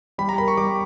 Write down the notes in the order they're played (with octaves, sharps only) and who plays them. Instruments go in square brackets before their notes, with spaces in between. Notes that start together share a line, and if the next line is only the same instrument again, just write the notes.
[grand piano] G3 [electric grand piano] B5
[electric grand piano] A#5
[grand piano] A#4 [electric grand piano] B5
[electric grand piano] C#6
[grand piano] G3 [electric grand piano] D6